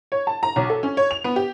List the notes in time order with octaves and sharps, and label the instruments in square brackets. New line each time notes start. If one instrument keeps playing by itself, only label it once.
[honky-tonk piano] C#5
A5
A#5
B1
A4
C#4
C#5
F7
B3
G4